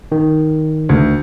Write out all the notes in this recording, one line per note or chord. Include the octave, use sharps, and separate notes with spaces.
D#3
D2